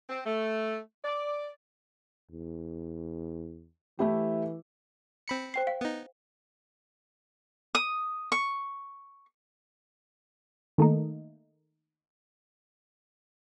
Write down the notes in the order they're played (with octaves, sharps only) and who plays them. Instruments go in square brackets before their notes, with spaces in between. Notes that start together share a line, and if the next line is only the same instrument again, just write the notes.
[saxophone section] C4
A3
D5
[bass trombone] E2
[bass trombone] E3 [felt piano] A3 E4 G4
[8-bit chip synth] C4 B5 C#7
[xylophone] C5 G5 C7
F5
[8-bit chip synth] B3 D#4
[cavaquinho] D#6
C#6
[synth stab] D#3 A3 A#3 D#4